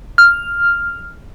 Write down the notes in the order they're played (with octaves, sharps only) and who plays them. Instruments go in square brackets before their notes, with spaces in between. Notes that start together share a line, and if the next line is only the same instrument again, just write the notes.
[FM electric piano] F6